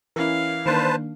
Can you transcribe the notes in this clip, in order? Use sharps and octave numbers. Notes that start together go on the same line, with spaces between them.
E3 C#4 E4 A#4 F5
D#3 A#3 D4 B4 C5 A5